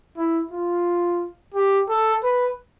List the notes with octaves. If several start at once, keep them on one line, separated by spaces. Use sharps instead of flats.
E4
F4
G4
A4
B4